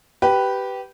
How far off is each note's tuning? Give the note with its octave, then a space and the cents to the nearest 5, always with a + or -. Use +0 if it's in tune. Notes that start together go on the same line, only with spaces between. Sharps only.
G4 -15 B4 +0